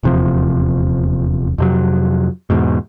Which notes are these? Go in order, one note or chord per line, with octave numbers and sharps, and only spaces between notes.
D#1 E2 C3 F3
F2 C3 F#3
E2 G#2 B2